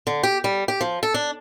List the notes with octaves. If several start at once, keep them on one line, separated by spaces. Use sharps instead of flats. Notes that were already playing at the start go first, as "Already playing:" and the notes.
D3
G4
G3
G4
F3
A4
D4